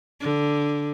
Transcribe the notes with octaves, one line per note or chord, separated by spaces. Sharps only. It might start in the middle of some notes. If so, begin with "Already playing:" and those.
D3